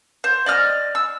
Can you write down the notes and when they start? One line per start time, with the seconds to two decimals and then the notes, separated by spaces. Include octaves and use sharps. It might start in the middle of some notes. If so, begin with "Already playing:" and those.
0.24 C5
0.46 D5 D#5 F6
0.95 E6